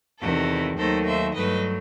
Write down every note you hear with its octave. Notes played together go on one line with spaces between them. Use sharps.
E2 C3 D#3 F#4 A4
D#2 D#3 F#3 A3 A4 C5
C5 E5
G2 F#3 A3 B4 D#5